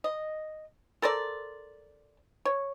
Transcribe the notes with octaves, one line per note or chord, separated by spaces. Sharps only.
D#5
A4 A#4 C5 D5
C#5